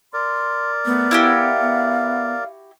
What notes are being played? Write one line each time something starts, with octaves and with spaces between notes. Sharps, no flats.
A#4 D5 C6
A3 B3
E4 F#4 G4 F5
B3